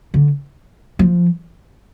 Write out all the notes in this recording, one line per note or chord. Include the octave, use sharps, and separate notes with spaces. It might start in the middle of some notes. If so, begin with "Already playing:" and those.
D3
F3